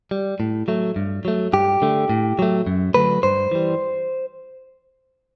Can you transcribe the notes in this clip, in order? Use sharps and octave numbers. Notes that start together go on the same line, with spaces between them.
G3
A2
F#3 A3
G2
F#3 A3
G2 G4
D3 A3
A2
F#3 A3
F#2
D3 F#3 A3 B4
G2 C5
E3 G3